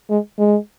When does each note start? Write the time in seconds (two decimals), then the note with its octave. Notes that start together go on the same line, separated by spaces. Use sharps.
0.10 G#3
0.39 G#3